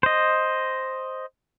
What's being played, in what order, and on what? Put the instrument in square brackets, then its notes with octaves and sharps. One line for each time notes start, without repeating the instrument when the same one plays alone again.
[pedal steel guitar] C5 D#5